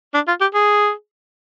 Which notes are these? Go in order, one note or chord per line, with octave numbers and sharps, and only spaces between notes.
D4
F4
G4
G#4